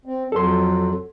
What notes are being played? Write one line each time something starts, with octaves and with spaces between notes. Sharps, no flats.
C4
F2 F#3 A4 C6